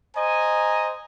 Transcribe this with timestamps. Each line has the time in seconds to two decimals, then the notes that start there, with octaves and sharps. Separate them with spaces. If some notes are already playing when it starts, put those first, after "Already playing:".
0.16 C5 D#5 G#5 A#5